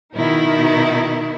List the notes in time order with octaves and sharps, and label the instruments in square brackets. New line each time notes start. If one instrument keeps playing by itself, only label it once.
[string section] B2 D#3 D#4 E4 A#4